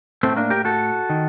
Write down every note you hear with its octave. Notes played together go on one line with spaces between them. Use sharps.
A2 A3 C4
A#3 D4
G4 A#4
F#4 A4
D#3